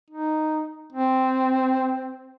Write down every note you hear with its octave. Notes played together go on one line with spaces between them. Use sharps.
D#4
C4